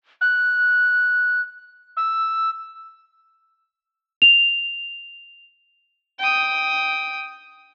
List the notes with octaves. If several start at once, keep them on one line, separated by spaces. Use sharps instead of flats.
F#6
E6
F7
G5 D#6